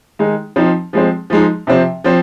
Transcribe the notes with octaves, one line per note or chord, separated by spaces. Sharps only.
D#3 G#3 D#4
F3 C4 D#4
F3 G#3 C4
F3 G#3 D#4
C3 F3 C4
F3 C4